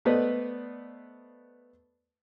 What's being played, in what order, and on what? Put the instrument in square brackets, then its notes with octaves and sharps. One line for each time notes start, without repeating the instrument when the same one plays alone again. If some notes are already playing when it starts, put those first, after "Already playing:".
[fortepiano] A3 B3 B4 C5 D5 D#5